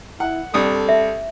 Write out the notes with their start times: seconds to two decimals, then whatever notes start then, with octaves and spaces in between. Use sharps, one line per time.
0.20 E4 F#5
0.54 C2 D4 A4 D#6
0.89 E5